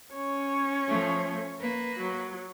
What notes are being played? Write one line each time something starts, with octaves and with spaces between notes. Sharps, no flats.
C#4 C#5
F3 A3
A#3 B4
F#3